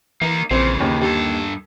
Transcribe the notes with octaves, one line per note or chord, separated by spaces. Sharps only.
E3 A#3 D#4
A#1 C#3 E3 C4
D#2 C#4
G2 G4 A4